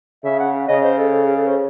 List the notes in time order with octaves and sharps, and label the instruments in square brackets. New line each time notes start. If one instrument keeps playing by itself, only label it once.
[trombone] C#3 [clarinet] E5
[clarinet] F#5
[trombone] C#3 [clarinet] D#5
[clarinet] C5
A4
A4
G#4
A4
C5